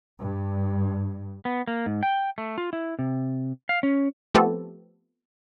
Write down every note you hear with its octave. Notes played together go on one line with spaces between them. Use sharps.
G2
B3
A#3
G#2
G5
A3
F4
E4
C3
F5
C#4
F3 A3 B3 C4 G4 A4